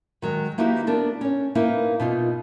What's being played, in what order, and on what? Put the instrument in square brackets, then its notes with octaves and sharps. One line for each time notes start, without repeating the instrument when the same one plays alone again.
[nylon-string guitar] D#3 F#3 G#3
A#3 D#4 E4 F#4 G4 B4
B3 D4 A#4
C#4 C#5
A#3 D#4 E4 A#4 B4
B2 D#4 F4